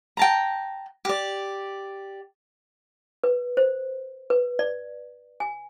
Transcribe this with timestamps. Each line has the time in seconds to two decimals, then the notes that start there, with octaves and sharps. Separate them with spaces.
0.17 G5 A5 A#5
1.05 G4 D5
3.24 B4
3.57 C5
4.30 B4
4.59 D5
5.40 G#5